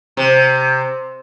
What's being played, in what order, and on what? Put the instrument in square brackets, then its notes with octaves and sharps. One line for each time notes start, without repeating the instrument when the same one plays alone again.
[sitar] C3